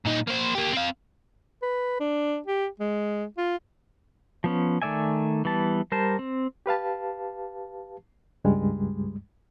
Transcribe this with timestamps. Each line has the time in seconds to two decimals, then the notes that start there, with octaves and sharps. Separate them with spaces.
0.05 A#2 D#4
0.27 A#3 C5
0.55 A#3 G4
0.72 C4 F5
1.62 B4
2.00 D4
2.46 G4
2.79 G#3
3.37 F4
4.44 F3 B3 C#4
4.82 D#3 A3 D5 E5 G#5
5.45 E3 G3 B3 A5
5.92 G3 A#4 C5 A5
6.19 C4
6.66 G4 B4 F5 A5
8.44 C#2 G2 G3 G#3